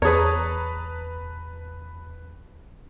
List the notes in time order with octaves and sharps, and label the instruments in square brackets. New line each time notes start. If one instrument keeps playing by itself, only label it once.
[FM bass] E2 [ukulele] G#4 C#5 [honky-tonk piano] B4 A5 A#5